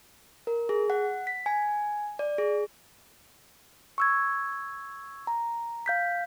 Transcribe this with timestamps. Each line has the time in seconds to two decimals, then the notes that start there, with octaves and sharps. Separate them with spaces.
0.47 A#4
0.69 G#4
0.90 F#5
1.27 B6
1.46 G#5
2.19 D5
2.38 G#4
3.98 C#6 E6 G#6
5.27 A#5
5.86 F5 G6 B6